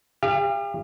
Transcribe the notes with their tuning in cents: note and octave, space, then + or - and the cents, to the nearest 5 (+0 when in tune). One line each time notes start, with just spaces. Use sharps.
G4 +40 F5 -35